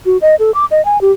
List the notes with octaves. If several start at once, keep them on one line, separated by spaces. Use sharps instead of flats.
F#4
D#5
A4
D6
D#5
G#5
G4